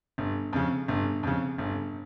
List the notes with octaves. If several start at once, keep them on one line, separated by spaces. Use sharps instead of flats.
G1
F2 C#3
G1
F2 C#3
G1